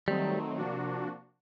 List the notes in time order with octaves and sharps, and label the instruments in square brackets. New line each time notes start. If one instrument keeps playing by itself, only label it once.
[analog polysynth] D#3 F#3 A3 C4 D#4 [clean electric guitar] G3
[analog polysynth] C3 F3 A#3 D4 F#4